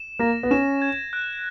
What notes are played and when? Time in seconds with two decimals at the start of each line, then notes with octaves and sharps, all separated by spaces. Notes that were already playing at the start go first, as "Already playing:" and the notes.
Already playing: E7
0.19 A#3 A#6
0.43 B3
0.51 C#4 E7
0.82 G#6
1.13 F#6